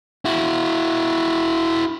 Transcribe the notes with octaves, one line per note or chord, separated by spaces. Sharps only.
E4 F#4